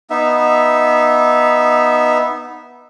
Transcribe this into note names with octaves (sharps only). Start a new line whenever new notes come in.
B3 D#4 E5